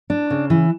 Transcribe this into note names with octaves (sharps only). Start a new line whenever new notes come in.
D4
C#3
E3